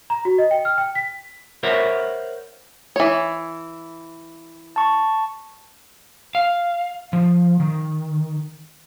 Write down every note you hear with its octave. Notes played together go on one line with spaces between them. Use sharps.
A#5
F#4
D#5
G5
F6
G5
B6
A#4 C5 C#5 E5 F#5
E3 C#5
A5 C#6
F5
F3
D#3